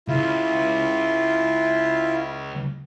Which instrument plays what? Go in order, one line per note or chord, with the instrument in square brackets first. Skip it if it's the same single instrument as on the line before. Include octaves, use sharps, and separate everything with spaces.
[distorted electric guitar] C#2 [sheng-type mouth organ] E4 F4